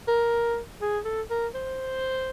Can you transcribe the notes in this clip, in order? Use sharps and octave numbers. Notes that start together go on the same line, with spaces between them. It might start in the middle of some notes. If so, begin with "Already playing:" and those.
A#4
G#4
A4
A#4
C5